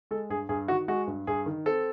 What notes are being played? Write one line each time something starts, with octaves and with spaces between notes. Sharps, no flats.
G#3 A4
G2 G#4
G2 G#4
D#3 F#4
G#3 F#4
G2
G2 G#4
D#3
C4 A4